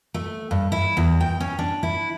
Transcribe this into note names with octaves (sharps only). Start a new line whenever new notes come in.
A3
G2
E4
E2
G5
C#4
D4
E4